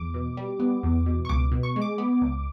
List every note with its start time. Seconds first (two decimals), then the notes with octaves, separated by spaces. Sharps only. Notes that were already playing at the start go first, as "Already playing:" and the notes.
Already playing: E2 D6
0.14 B2
0.37 G3
0.59 B3
0.83 E2
1.06 B2
1.25 C#6
1.29 C#2 D6
1.52 B2
1.63 C#6
1.76 G#3
1.82 D6
1.98 B3
2.21 C#2